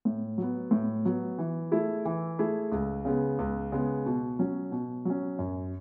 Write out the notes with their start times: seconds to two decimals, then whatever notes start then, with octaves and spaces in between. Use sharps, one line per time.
0.05 A2
0.38 F#3 B3
0.71 A2
1.05 F#3 B3
1.39 E3
1.71 A3 E4 G#4
2.05 E3
2.39 A3 E4 G#4
2.72 C#2
3.05 C#3 G#3 B3
3.39 C#2
3.72 C#3 G#3 B3
4.06 B2
4.39 F#3 C#4
4.72 B2
5.05 F#3 C#4
5.39 F#2